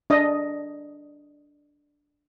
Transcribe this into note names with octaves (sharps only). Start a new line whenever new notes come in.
D4 D#5